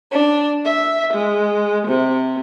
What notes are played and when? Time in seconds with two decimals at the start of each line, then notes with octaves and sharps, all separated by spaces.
0.11 D4
0.65 E5
1.13 G#3
1.87 C3